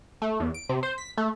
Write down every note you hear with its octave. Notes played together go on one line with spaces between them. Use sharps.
A3
E2
D7
C3
C5
B6
A3